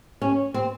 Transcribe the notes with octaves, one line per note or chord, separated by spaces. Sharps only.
C#4
C4